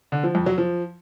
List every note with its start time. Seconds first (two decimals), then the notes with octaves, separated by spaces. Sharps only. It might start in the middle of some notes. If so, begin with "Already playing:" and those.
0.12 D3
0.23 F3
0.35 F2
0.46 F#3
0.58 F3